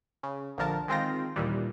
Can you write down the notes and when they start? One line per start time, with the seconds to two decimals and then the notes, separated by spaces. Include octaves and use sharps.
0.23 C#3
0.58 A#1 D3 F3 A#4 A5
0.88 D#3 G#3 C4 F4 G5 A#6
1.36 D#2 A#2 E3 G3